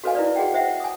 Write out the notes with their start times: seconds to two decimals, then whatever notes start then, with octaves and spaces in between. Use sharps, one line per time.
0.04 F#4 A4 B4 D#5 F5 G#5
0.15 E4 A#4 B4 D5
0.36 F#4 G#4 D#5 F#5 G5
0.54 C5 D#5 E5 F#5 G5
0.80 G#5 D#6